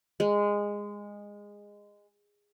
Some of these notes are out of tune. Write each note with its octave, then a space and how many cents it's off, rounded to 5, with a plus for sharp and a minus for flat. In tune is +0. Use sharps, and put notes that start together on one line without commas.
G#3 -15